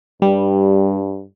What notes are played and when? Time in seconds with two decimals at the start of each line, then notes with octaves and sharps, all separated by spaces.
0.22 G2 G3